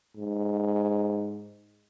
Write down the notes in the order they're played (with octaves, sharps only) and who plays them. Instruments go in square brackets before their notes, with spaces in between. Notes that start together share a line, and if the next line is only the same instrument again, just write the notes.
[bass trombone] G#2